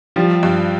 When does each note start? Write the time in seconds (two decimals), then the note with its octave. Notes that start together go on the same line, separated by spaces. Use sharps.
0.16 F3 G3
0.43 G2